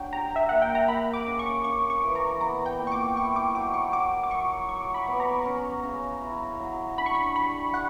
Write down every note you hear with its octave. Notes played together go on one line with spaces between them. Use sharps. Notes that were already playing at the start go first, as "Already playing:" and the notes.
Already playing: F#3 D4 G5
G4 A#5
E5
A#3 F#5
G5
A#5
A#3 B5
D6
C#3
C#6
C#3 C#6
C#6
E3
A#5
B3 A#5
G5
A#2
C#6
D6
E4 C#6
D6
F#3 D6
C#6
F#4 D6
D6
F#3 C#6
F#3 C#6
B5
B3
A#5
C#4
C#3
E4
F#3
D4 B5
C#6
B5
G3 B5
G3 F#5